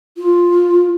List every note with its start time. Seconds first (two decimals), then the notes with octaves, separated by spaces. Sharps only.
0.17 F4